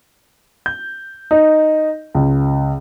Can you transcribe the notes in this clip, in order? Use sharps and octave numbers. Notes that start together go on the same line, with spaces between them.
G6
D#4
C#2